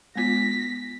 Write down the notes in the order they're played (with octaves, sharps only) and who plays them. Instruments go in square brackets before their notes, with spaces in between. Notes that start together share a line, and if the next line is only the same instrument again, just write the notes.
[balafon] G#3 B3 F4 [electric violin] A#6 B6